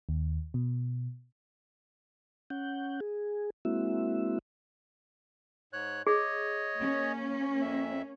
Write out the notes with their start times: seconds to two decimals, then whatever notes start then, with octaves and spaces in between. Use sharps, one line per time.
0.09 D#2
0.54 B2
2.50 C#4 F#5 G6
3.00 G#4
3.65 G#3 A#3 C4 E4 F#4 E5
5.73 G#2 C#5 F#6
6.07 G#4 C#5 D#5
6.77 A#3 C#4
7.62 F2 E5